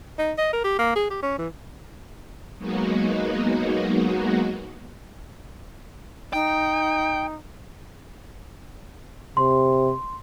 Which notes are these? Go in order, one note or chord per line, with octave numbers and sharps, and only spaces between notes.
D#4
D#5
A#4
G4
A#3
G#4
G4
C#4
E3
F#3 G#3 A#3 B3 D#4 F#4
D#4 G5
C3 C6